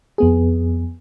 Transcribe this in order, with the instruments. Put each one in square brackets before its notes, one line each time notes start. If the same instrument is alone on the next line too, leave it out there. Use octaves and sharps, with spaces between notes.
[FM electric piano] F2 B3 G#4